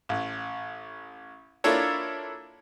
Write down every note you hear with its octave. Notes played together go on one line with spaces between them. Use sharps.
A1
A#3 D4 E4 F4 A4 C#5